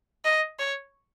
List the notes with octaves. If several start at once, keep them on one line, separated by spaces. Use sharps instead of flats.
D#5
C#5